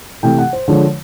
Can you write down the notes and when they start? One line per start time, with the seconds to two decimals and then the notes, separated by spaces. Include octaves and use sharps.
0.23 C3 E3 A3 G5
0.38 F#5
0.53 C5
0.68 D3 F3 G#3 C#5